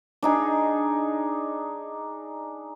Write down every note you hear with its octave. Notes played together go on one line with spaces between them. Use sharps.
D4 D#4 G#4